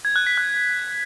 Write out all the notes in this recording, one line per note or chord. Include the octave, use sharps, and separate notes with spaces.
G#6
F#6
B6
F#6